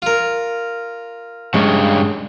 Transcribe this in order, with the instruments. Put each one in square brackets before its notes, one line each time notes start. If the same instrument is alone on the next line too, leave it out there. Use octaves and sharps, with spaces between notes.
[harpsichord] F4 A#4
[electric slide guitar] G2 C#3 [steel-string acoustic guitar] G#3